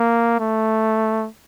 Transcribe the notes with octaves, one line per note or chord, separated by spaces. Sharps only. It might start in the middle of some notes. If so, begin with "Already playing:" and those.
Already playing: A#3
A3